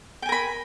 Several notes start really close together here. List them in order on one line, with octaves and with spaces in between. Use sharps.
G5 G#5 A#4 B5